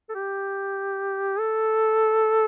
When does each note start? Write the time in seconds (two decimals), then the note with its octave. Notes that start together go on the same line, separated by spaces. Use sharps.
0.10 A4
0.15 G4
1.39 A4